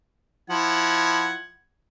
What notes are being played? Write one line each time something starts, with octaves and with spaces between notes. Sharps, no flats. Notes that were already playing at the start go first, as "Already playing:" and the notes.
F3 E4 F#5 G#6